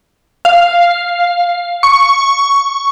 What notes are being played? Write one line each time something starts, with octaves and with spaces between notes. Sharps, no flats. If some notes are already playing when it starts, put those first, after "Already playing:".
F5
C#6